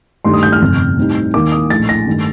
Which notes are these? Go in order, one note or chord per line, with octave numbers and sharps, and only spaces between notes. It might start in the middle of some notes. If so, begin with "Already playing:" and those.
G2 D#3 A3 D#4 C6
D#6
G6
F6
G1 F2 C3
A2 G3 C4 D#4
D#2 D#3 A#3 D6
D#6
A#1 A2 A3 A6
A#6
G2 D#3 A3 D#4